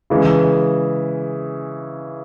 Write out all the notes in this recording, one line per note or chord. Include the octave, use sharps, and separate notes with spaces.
C#3 E3 G#3